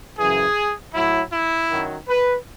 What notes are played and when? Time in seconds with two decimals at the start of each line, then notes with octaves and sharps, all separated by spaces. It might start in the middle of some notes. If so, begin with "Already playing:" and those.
0.18 F#2 C#3 E3 G#4
0.94 A2 F#3 E4
1.32 E4
1.70 F#2 D#3 F#3
2.08 B4